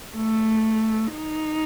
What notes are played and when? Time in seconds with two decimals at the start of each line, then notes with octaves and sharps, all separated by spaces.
0.16 A3
1.14 D#4